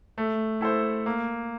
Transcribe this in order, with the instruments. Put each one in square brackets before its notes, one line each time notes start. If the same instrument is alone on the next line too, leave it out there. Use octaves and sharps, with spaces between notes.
[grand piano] A3
E4 A4 C5
A#3